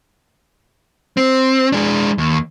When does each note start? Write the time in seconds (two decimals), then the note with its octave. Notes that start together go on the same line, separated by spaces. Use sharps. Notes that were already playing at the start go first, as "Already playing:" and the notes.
1.17 C4
1.72 G#3 D4
2.18 D#2